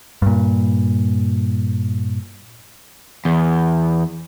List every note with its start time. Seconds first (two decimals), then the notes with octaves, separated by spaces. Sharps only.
0.22 G2 A#2
3.25 E2